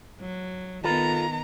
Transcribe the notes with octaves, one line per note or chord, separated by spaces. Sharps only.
F#3
D#3 B3 F4 A4 B4 A#5